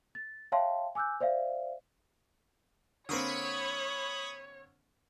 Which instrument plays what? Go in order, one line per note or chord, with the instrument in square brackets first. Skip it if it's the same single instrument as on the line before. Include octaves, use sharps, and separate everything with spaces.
[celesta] A6
C#5 E5 F5 G5 A5 C6
G#5 D6 E6 F#6 G6
C5 D5 E5 F5
[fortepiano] D3 A#3 C4 [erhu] C#5 [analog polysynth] B5 C#6 D#6